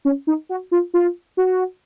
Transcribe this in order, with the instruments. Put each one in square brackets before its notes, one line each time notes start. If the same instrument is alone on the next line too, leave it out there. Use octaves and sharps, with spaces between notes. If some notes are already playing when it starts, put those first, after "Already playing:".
[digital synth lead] C#4
D#4
F#4
F4
F4
F#4